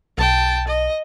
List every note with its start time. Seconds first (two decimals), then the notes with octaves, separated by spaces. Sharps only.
0.18 B1 G5 A5
0.68 D#5